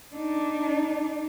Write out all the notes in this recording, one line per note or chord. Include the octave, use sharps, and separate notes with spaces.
D4 D#4